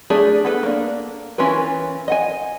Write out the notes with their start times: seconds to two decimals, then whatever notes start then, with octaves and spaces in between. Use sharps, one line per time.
0.10 A3 D4 G#4 D5
0.45 B3 A4 B4
0.63 A#3 D4
1.38 E3 C#4 F4 A#4 B4
2.08 D#5 F#5 G#5